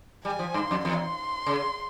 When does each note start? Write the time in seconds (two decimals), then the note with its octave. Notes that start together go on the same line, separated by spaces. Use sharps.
0.24 G3 G#5
0.39 F3
0.54 G2 C6
0.71 F2
0.85 E2 C6
1.46 C#3